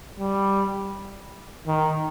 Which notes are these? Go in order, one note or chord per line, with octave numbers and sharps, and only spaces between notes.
G3
D#3